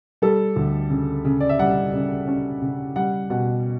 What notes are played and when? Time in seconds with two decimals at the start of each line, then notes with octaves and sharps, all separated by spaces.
0.22 G3 A4
0.56 D2
0.90 C#3
1.25 C#3
1.40 D5
1.49 E5
1.59 G3 F#5
1.93 C#3
2.28 C#4
2.62 C#3
2.96 G3 F#5
3.30 B2 F#5